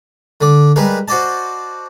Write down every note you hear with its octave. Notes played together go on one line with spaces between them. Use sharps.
D3 D5
G3 G#3 A#4 B4
F#4 C5 D5 D#5 A5